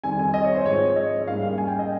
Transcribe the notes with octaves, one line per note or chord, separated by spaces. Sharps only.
F2 D#3 G3 C4 G#5
G#5
D#5
C#5
C5
G#2 F3 G#3 C4 C#5
C#5
D#5
G#2 G3 A#3 C#4 F5
F5
G#5
G5
D#5